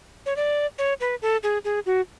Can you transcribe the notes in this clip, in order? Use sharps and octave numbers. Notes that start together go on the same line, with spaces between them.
C#5
D5
C#5
B4
A4
G#4
G#4
F#4